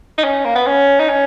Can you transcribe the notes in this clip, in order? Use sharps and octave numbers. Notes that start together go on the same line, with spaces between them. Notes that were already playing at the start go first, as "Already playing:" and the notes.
D#4
C#4
A#3
B3
C#4
D#4
C#4